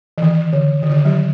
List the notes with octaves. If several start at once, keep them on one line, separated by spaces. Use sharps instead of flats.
E3
D#3
D3
D#3
D3
D#3
F#3